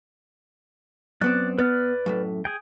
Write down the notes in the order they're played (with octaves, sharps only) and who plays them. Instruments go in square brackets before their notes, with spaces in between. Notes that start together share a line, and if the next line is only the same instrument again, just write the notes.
[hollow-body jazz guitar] F#2 B3 C4 [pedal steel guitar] D5 F#6
[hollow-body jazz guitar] B3 [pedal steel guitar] B4 D5 F6
[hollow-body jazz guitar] F#2 A2 A3
[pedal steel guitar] G#4 G5